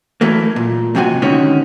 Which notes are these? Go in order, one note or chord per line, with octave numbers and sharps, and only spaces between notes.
E3 F#3 A3 A#3
A#2
F2 G#2 C3 C4 F#4 G#5
G#2 D3 D#3 C4 C#4 F#4